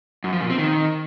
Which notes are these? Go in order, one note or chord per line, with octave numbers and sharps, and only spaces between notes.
F#2
F3
A#2
C4
D#3